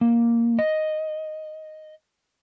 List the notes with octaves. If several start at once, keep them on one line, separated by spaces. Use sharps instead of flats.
A#3
D#5